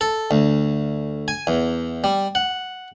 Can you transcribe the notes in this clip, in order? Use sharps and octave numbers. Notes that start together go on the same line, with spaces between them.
A4
D2
G#5
E2
G3
F#5